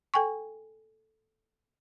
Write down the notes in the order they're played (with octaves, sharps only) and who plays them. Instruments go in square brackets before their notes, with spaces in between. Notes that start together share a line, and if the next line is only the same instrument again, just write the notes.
[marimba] A4 G5 G#5 C#6